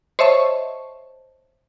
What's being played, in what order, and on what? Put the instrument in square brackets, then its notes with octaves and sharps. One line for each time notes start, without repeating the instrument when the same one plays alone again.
[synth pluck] C5 C#5 D#5 E5 A5 C#6